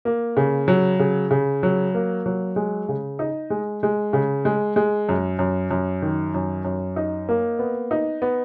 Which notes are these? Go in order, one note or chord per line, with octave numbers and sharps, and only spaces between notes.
A#3
C#3
F#3
C#3
C#3
F#3
A#3
F#3
G#3
C#3
D#4
G#3
G#3
C#3
G#3
G#3
F#2
F#2
F#2
D#3
F#2
F#2
D#4
A#3
B3
D#4
B3